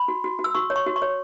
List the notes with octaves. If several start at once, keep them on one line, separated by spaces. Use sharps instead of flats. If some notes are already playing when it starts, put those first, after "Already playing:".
Already playing: B5
F#4
F#4
F#4
E6
F#4 C#6
C#5
C#6
F#4
C#6
C#5